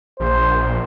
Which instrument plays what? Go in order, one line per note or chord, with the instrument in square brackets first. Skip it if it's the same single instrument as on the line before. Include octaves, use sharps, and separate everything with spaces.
[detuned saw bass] A#1 [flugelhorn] C5